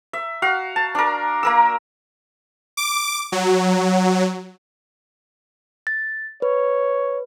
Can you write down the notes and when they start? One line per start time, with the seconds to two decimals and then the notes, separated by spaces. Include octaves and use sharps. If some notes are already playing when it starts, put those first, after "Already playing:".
0.13 E5
0.42 F#4 F5
0.76 A5
0.95 D4 A#4
1.43 A#3 A#4 E6
2.77 D6
3.32 F#3
5.87 A6
6.42 B4 C#5